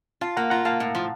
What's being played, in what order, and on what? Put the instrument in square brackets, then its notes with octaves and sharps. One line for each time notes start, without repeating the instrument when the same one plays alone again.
[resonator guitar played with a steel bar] F4 [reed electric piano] F5 A5
[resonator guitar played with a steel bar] A#3 [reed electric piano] F#5 A#5
[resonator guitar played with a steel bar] F4 [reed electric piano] F#5 A#5
[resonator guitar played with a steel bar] A#3 [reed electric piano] F5 A5
[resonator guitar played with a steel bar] A2
F3